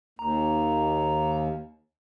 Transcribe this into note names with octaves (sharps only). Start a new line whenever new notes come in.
D#2 A#5